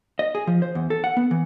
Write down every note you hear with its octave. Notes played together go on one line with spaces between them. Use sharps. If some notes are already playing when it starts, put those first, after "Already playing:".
D#5
G#4
F3
C5
E2
A4
F#5
B3
E3